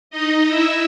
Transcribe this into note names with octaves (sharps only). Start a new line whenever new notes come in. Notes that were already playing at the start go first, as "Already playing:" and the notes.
D#4 D#5
E4 E5